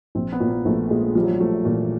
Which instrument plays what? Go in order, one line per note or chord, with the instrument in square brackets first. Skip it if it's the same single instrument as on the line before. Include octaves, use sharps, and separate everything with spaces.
[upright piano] A#1 [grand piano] C4
[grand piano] B3
[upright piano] A#2
[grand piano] A#3
[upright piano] A#1 [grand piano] A3
[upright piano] A#2 [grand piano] G#3
[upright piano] F3 [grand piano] G3
[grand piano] F#3
G3
[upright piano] F3 [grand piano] A3
[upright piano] A#2 [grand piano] E3